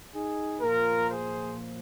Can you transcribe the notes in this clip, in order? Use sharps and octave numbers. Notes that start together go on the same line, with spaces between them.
D#4 G#4
A#2 F3 F4 A#4
G#4 C5